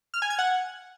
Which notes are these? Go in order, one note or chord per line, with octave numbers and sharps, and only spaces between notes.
F6
G#5
G#6
F#5